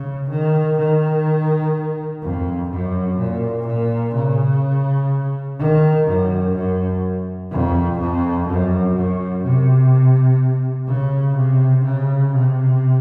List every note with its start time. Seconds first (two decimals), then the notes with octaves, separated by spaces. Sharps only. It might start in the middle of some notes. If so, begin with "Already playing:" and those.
Already playing: C#3
0.30 D#3
0.78 D#3
2.23 F2
2.70 F#2
3.19 A#2
3.66 A#2
4.15 C#3
5.59 D#3
6.07 F#2
6.55 F#2
7.51 F2
8.00 F2
8.48 F#2
8.96 F#2
9.44 C3
10.88 C#3
11.36 C3
11.85 C#3
12.33 C3